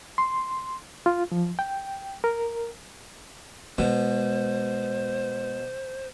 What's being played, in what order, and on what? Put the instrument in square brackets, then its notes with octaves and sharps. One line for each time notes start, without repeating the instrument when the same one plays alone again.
[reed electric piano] C6
F4
F3
G5
A#4
[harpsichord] B2 [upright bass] G#3 [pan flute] C5